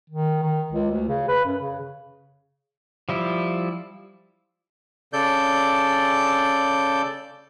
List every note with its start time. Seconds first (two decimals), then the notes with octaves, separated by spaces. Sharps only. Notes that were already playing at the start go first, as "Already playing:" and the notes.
0.10 D#3
0.43 D#3
0.72 C#2
0.91 D2
1.08 C#3
1.28 B4
1.45 F#2
1.60 C#3
3.09 F3 G3 E4
5.13 C#3 A4 D5 G6